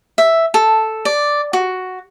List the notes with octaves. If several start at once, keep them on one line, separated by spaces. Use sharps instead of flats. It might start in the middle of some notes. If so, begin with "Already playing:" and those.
E5
A4
D5
F#4